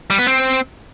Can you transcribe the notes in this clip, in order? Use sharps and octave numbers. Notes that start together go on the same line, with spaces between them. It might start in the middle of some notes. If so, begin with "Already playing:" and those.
G3
B3
C4